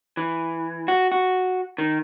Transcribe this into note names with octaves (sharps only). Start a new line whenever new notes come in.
E3
F#4
F#4
D#3